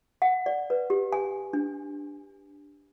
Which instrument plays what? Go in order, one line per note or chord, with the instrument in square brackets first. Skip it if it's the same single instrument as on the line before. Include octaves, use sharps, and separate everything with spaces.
[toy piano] F#5
D5
B4
G4
G#5
D4